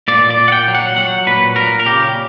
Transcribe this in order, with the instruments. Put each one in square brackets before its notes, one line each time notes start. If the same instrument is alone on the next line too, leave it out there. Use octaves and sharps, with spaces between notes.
[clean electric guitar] A#2 D5
D5
A#2
F#5
G5
F#3
F#5
F#3 F#5
A#2 B4
A#2 A#4
A#4
C#3 G4